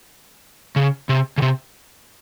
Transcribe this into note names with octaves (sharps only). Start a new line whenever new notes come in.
C#3
C3
C#3
C3